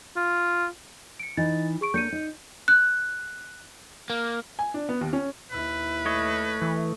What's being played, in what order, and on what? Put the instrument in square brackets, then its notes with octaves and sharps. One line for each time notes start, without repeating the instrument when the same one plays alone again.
[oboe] F4
[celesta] C#7 D7
[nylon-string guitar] E3 D#4 [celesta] D#5 A6
[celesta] G#4 C#6 D7
[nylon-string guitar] A#3 D4 [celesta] G6 C#7 D#7
[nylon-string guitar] D#4
[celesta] F#6
[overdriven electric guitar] A#3
[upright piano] G#5
D4
B3
D#2
C#4
[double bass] D#2 E4 [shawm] B4
[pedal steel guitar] A3 C#5 D#5
[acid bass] E3